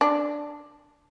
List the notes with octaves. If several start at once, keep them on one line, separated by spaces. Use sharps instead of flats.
D4